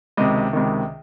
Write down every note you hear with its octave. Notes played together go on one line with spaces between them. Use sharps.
C#2 C3 D#3 D#5
C#2 C3 D#3